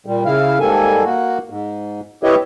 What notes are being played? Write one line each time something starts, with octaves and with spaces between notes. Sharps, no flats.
A#2 G3
C#3 E4 F5
G#2 G3 A#3 A4 G#5
A#3 F#4
G#2
E4 G4 B4 C#5 D#5 E5